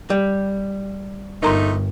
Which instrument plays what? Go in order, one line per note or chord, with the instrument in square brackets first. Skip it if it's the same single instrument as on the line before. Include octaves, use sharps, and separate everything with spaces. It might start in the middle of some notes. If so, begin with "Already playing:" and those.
[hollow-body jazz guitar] G3
[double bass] G1 [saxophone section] A#2 A3 D#4 [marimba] A#4 A#5 C6